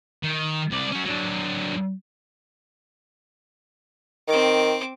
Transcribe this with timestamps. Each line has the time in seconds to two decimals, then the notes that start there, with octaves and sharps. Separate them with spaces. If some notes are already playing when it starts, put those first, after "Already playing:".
0.23 D#3
0.71 C2 D5
0.92 C#4 F#4
1.06 F#3 D4
4.28 D#3 C4 D6